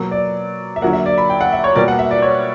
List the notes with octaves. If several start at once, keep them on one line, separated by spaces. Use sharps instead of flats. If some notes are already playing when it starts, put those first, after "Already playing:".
Already playing: B2 F#3 A#3
D5
E5
D3 F#3 A#3 F#5
E5
D5
B5
G5
F#5
E5
C#5
B2 G3 A#3 D5
F#5
E5
D5
C#5